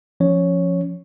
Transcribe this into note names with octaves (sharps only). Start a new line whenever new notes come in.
F3 C#4 C#5